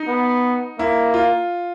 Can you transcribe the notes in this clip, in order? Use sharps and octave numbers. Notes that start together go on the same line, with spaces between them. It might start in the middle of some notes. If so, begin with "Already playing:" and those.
Already playing: D#4
B3
A#3 E4
F4